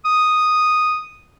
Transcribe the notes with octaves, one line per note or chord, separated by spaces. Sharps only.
D#6